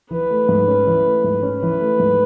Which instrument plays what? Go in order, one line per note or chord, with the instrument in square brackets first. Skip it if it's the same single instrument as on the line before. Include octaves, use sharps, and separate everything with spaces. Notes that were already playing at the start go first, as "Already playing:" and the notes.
[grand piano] E3 [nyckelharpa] B4
[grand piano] A3
G#2
C#4
E3
A3
G#2
C#4
[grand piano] E3 [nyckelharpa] B4
[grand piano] A3
G#2